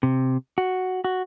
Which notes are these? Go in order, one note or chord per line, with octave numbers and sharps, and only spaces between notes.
C3
F#4
F#4